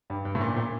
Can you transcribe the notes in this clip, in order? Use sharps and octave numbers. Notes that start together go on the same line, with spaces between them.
G2
G2
A2
A#2
A#2